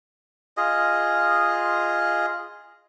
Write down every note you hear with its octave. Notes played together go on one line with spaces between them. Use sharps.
F4 G#4 D#5